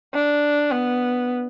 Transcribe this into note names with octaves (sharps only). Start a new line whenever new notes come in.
D4
B3